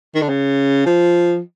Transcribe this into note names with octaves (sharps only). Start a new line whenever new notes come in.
D#3
D3
C#3
F3